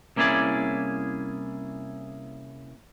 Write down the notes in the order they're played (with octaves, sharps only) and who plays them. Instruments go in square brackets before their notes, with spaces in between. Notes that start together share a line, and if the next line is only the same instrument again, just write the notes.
[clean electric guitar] C2 A#3 C#4 E4 G#4 D5